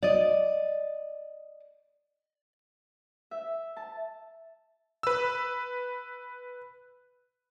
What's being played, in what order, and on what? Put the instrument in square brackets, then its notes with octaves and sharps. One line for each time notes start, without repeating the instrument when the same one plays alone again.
[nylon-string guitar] D5 D#5
[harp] E5
A5
[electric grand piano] B4 E6